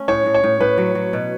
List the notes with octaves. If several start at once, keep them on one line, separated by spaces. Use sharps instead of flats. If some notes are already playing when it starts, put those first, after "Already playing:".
Already playing: A3 C#4
A2 C#5
A2
C#5
A2
A2 B4
F#3
F#3
B2